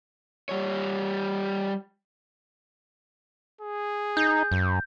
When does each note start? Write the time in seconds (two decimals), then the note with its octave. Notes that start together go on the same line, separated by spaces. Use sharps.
0.49 G3 C#5
3.61 G#4
4.17 D#4 G6
4.52 F#2